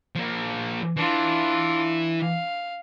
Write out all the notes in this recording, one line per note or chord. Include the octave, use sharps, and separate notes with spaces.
F3 A#3
E3 D4 F4
F5